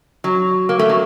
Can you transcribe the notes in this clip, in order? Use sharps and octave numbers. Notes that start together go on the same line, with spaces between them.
F#3
A#3
A3
F#3